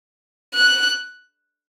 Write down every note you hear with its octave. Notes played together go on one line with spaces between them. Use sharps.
F#6